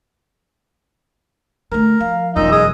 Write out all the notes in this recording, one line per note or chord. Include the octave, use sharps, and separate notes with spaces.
D3 A3 A#4
F3 F5
E1 F#2 A#2 D#4 E6
G#3 D#6